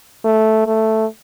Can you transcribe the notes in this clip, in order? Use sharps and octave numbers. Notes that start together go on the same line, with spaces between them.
A3
A3